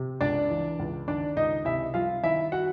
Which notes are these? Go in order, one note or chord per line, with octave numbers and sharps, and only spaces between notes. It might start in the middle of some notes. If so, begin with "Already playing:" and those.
Already playing: C3
C#2 D4 D5
E3
C#2
D#3 D4 D5
C#2 D#4 D#5
C3 E4 E5
G3 F4 F5
D#3 E4 E5
F#4 F#5